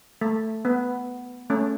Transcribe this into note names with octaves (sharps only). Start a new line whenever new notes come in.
A3
B3
A3 C#4